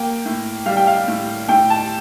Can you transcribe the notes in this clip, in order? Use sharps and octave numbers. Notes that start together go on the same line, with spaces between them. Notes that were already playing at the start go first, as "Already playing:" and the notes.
Already playing: A#3 G5
A2
G3 F5
G5
F5
A2
A2 G5
A5